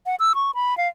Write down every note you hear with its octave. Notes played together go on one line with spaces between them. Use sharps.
F#5
E6
C#6
B5
F5